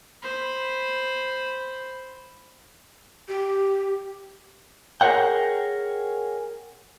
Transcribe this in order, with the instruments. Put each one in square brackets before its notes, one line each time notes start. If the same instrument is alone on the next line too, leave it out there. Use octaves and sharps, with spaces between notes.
[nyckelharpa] C5 B5
[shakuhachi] G4
[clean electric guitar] G#4 A#4 C5 C#5 F#5 G5